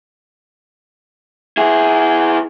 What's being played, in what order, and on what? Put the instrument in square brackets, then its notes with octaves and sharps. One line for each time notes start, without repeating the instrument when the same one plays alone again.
[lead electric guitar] E4 G#4